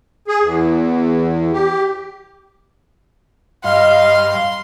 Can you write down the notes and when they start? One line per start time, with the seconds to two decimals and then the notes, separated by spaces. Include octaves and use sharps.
0.28 G#4
0.42 E2
1.53 G4
3.64 G2 D#5 F5 C6